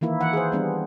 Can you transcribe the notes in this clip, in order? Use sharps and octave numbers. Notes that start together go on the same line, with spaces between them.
D#3 E3 A#3 E4
E3 F#5
G#4 C5
G3 B3 D4